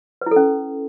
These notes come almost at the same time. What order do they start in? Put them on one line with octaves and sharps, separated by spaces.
B4 E4 A4 C#4